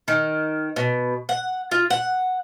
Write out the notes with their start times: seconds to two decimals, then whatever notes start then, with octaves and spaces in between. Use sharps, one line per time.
0.08 D#3
0.76 B2
1.29 F#5
1.71 F4
1.90 F#5